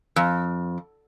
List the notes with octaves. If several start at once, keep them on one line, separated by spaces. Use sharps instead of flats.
F2